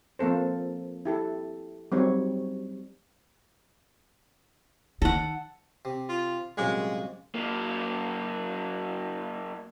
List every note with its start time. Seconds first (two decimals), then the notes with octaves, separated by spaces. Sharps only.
0.19 F3 A#3 C4 A4 C5
1.05 E4 G4 A4
1.92 F#3 G3 C4 D#4 C#5
5.02 D#3 A4 F#5
5.85 C3
6.09 F4
6.57 C2 F#2 A#2 G#3
7.34 F#3 A#3